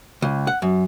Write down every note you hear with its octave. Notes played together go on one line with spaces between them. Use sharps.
C#2
F#5
F#2